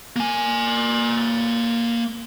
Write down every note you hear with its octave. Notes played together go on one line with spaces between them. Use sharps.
A#3 G#5